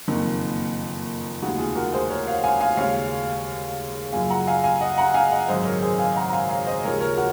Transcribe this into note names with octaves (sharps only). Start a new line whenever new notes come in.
F#1 F2 D#3 A#3
F1 D#2 C#3 G#3 D#4 F#4
F4 G#4
F#4 A#4
G#4 C5
A#4 C#5
C#5 F5
F5 G#5
F5 G#5
D#2 C#3 G#3 C#5 F5
F#1 F#2 C#3 F3 F5 G#5
F#5 A#5
F5 G#5
F5 G#5
D#5 F#5
F#5 A#5
F5 G#5
D#5 F#5
G#1 F#2 C#3 G#3 C5 D#5
A#4 C#5
G#4 C5
F5 G#5
F#5 A#5
A#5
F5 G#5
C#5 F5
C5 D#5
D#2 C#3 F3 G#3 A#4 C#5
A#4 C#5
F#4 A#4